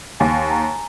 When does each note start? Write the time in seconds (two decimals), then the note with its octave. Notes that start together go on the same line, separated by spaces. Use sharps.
0.20 D#2 G#5
0.51 A#5